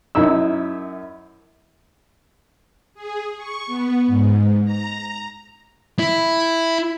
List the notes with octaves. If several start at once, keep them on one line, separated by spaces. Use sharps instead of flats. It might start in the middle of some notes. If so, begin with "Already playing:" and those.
F#2 D#4 E4 E6
G#4
C#6
B3
G#2
A#5
E4